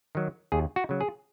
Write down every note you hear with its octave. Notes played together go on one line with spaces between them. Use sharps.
D#3 F#3
D#2 G#4
F#4
C#3 F#3
G#4